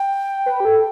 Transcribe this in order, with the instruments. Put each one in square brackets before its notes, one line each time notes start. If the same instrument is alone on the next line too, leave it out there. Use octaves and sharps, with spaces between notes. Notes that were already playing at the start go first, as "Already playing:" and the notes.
Already playing: [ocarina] G5
[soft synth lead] B4
G4
A4